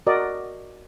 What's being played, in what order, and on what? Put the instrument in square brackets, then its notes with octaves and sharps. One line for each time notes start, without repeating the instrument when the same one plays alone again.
[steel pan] F#4 A#4 D5 D#5